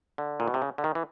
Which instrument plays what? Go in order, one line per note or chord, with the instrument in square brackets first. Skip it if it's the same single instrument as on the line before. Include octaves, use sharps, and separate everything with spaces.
[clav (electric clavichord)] D3
A#2
B2
C3
C#3
D3
D#3
E3